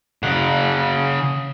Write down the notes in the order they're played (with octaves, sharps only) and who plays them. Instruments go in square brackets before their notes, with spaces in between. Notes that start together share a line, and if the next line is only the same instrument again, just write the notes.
[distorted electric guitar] C#3 F#5